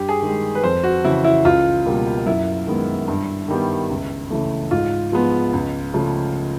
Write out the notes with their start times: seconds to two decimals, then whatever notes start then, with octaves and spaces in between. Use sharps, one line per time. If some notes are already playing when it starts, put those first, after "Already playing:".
Already playing: G2 G4
0.09 G#4
0.22 D#3 G#3
0.55 B4
0.64 F2 C5
0.83 F#4
1.05 C#3 E3 E4
1.24 E4
1.45 C#2 F4
1.86 B2 G3 A#3
2.26 F#2 E4
2.67 D#3 G#3 B3
3.08 G2
3.48 D#3 G3 B3
3.90 C#2
4.30 C#3 E3 A3
4.71 G#2 F4
5.12 F3 G#3 B3
5.53 C#2
5.94 C#3 F3 A3